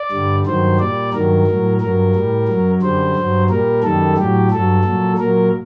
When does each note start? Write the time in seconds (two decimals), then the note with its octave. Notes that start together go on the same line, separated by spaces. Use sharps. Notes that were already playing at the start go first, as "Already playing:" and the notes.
Already playing: D5
0.12 G2 D3 G3
0.46 G2 D#3 F#3 C5
0.79 A#2 G3 D5
1.13 G2 D#3 F#3 A#4
1.47 A2 F#3
1.81 G2 F#3 A#4
2.15 A2 G3
2.48 F#2 F#3
2.82 F#2 D3 G3 C5
3.16 G2 F#3
3.50 A#2 G3 A#4
3.83 F#2 D#3 G3 A4
4.17 A2 F#3 G4
4.51 G2 F#3 A4
4.84 A#2 F#3
5.18 A#2 F#3 A#4